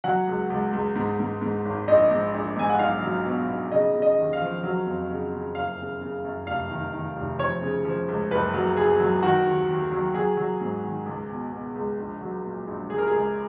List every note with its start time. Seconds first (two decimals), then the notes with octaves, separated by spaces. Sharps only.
0.04 F#3 F#5
0.27 C#2
0.50 C#2
0.73 C#2
0.96 G#2
1.19 G#2
1.42 G#2
1.65 G#1
1.88 A#1 D#5
2.11 G#2
2.34 A#1
2.56 G#2 G#5
2.70 F#5
2.79 B1 F5
3.03 F#3
3.25 B2
3.49 B2
3.71 C#3 D#5
3.95 C#3
4.02 D#5
4.17 D#2
4.33 F5
4.41 F3
4.63 F#3
4.86 F2
5.10 C#3
5.33 C#3
5.55 F#1 F5
5.78 C#3
6.01 C#3
6.24 F#2
6.47 F1 F5
6.70 D#3
6.93 D#3
7.16 F1
7.39 F3 C#5
7.62 C#3
7.85 F3
8.08 C#2
8.31 F#1 B4
8.54 F#3
8.77 F#1 G#4
9.00 F#3
9.22 D#3 F#4
9.46 D#2
9.69 D#2
9.92 F#3
10.14 F#3 G#4
10.37 F#3
10.61 G#2
10.84 D#3
11.06 C#2
11.30 B2
11.52 B2
11.75 C#2
11.98 A#1
12.21 F#3
12.45 A#2
12.67 A#1
12.90 C#2 G#4
12.98 A#4
13.07 G#4
13.13 C#2